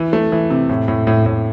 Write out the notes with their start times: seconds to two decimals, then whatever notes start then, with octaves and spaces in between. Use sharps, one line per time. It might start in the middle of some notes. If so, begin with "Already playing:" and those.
Already playing: E3
0.13 A3
0.32 E3
0.50 C3
0.69 A2
0.88 A2
1.07 A2
1.26 A2